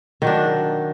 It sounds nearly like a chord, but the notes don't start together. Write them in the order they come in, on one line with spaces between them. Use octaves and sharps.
D#3 F#3 D4